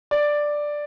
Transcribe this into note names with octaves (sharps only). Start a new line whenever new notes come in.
D5